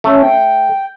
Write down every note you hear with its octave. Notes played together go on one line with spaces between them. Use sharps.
A3 C#4
G5